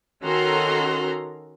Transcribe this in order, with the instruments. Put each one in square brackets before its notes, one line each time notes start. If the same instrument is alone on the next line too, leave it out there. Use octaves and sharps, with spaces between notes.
[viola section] D#3 C#4 F#4 A4 A#5 C6